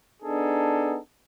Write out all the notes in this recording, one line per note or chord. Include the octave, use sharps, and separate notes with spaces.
B3 D4 D#4 G#4 A4